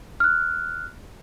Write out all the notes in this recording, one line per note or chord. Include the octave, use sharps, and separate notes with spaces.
F6 F#6